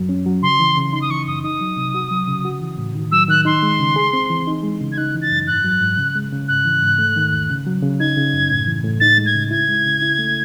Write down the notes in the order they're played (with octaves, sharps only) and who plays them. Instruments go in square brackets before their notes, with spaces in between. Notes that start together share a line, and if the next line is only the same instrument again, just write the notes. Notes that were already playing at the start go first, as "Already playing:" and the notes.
Already playing: [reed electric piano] F#2 F#3
C#4
F#3
[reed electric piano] C#3 [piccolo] C6
[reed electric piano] E3
C#3
[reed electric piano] D#4 [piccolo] C6
[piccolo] D#6
[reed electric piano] E3 [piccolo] C#6
[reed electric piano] F#2 [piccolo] D#6
[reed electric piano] D#4 [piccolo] D#6
[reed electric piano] F#3
C3
F#4
F#3
C#3
F#4
E3
A2
D#3
[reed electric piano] F#3 [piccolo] E6
[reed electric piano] D#3 [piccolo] F#6
[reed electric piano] D#4 [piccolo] C6
[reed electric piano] G#3
C#3
G#4
C4
E3
D#4
G#3
C#3
[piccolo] G#6
[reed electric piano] D#4 [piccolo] F#6
[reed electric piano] E3
[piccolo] A6
[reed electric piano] F#2
[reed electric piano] G#2 [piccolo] F#6
[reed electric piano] F#3
G#2
C#3
G#3
C#3
[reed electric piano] G#2 [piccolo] F#6
[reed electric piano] E3
G#2
A3
D#3
E2
C#3
F#3
C#3
[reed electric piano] D#4 [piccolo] G#6
[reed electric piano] C#3
F#2
A2
E3
A2
[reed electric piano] D#4 [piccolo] A6
[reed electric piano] G#3
[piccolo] G#6
[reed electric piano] C#3
[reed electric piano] E4 [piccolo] G#6
[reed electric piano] G#3
C#3
E4
A3